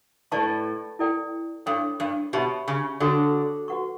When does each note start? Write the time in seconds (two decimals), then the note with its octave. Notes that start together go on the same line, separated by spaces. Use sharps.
0.32 A2 B4 D5 A5 C#6
0.99 E4 A4 D5 G5
1.66 G2 A4 C#5 G5
2.00 G2
2.33 B2 G4 C#5 E5 B5
2.68 C#3
3.00 D3 F#4 A4 C#5 G5 C#6
3.68 F#4 B4 F#5 C#6